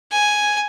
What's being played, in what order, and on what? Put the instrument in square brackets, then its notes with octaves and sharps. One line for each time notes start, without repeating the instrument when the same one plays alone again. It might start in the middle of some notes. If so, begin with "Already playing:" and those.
[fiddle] G#5